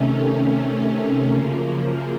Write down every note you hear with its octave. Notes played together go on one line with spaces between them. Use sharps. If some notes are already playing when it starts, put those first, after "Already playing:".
Already playing: C3 D#3 A3 C#4
F#2 C#3 F3 A#3